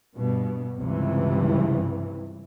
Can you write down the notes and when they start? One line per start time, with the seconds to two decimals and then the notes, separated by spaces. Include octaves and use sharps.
0.15 G2 B2
0.76 C#2 G2 C3 E3